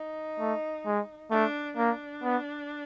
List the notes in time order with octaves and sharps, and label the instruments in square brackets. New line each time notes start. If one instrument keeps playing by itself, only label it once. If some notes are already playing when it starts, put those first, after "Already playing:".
Already playing: [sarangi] D#4
[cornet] A3
G#3
[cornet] A3 [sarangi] D4
[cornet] A#3 [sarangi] D4
[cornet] B3